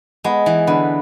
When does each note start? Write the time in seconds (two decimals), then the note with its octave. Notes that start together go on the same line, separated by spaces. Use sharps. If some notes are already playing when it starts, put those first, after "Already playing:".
0.24 G#3 B3
0.46 E3
0.67 D3 B3